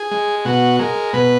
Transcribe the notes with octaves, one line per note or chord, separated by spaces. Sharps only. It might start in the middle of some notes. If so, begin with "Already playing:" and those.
Already playing: G#4
G#3
B2 F#4
G#3 A#4
B2 B4